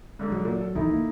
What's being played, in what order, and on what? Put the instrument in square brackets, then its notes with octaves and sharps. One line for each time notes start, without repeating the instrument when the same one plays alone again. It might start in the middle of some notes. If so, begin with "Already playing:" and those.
[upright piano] G#2 D3
[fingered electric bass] F#3
[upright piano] A#2
A4
[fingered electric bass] D2 D#3 E3 [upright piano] D#4 E4 A4
[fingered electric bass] A#3